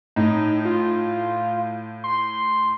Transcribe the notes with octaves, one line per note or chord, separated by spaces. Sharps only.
A2 D#4
F4
C6